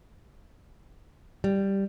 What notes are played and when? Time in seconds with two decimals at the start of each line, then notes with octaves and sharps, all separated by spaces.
1.44 G3